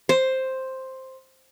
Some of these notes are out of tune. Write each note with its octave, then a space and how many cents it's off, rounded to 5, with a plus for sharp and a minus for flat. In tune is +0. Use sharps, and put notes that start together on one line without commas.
C5 +5